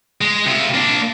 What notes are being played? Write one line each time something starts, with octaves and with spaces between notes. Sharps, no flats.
G#3
C3 F4
A#3 D4